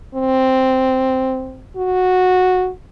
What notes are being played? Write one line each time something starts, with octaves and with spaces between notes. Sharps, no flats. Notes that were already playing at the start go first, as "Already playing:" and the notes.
C4
F#4